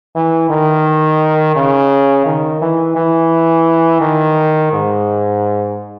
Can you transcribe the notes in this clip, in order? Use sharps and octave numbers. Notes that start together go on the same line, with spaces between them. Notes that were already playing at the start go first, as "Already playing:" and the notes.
E3
D#3
C#3
D#3
E3
E3
D#3
G#2